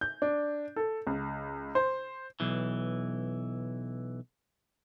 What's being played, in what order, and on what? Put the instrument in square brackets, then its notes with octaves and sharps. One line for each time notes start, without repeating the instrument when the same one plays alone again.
[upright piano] G6
D4
A4
C#2
C5
[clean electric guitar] B1 E3